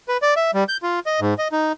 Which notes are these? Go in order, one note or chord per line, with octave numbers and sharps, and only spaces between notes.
B4
D5
E5
G3
G6
F4
D#5
G#2
D#5
D#4